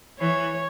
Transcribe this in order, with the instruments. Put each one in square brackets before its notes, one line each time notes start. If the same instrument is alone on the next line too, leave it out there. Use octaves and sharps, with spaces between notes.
[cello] E3 [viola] C#5